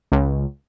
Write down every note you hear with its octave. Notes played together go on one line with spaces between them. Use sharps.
C#2